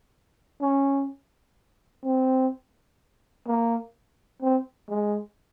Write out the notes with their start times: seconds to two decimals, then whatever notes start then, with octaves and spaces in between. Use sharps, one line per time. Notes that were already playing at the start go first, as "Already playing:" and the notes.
0.62 C#4
2.05 C4
3.48 A#3
4.42 C4
4.89 G#3